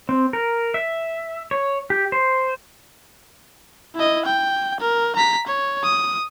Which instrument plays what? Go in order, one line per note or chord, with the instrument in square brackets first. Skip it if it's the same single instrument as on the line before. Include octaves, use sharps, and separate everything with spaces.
[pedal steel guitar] C4
A#4
E5
C#5
G4
C5
[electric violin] E4 D#5
G5
A#4
A#5 B6
C#5
D#6